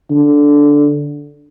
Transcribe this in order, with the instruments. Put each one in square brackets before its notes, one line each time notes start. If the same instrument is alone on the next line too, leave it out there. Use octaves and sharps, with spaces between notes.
[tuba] D3